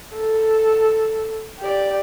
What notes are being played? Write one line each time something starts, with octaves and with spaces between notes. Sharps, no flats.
A4
G4 D5